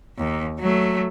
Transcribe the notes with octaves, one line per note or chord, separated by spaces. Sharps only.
D#2
F#3 A3